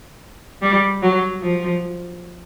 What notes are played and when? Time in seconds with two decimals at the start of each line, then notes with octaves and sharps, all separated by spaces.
0.62 G3
1.02 F#3
1.42 F3